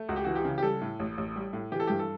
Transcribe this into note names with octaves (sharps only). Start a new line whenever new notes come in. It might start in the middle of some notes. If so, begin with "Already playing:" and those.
Already playing: A3
C#2 F#4
G4
E3 F#4
G4
C#3
G4
G3 A4
A2
A1
A1
G3
A2
E3 G4
A4
G2 G4
A4